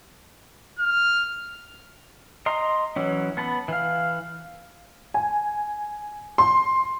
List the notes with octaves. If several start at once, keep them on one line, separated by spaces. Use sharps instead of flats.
F6
D#5 A#5 C6
E3 F#3 C#4
B3 A5 B5
E3 F5
G#5
C6